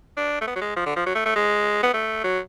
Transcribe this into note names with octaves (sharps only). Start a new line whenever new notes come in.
D4
A3
B3
F#3
G#3
F3
D3
F3
F#3
A3
A3
G#3
B3
A3
F#3